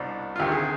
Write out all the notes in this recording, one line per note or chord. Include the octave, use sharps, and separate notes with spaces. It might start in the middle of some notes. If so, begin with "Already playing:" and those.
Already playing: C2 B2 D4
F4
D2 C3 D#3 G4
G#4